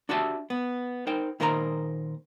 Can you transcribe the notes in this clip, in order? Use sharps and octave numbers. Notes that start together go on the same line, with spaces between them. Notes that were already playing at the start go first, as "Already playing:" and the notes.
D4 F#4 G4 E5 A5
B3
D#4 A#4 C5 G5
A#2 D#3 A#4 C5 D5 A#5